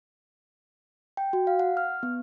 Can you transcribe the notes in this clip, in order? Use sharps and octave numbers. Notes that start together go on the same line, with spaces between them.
G5
F#4
F5
F#5
F6
B3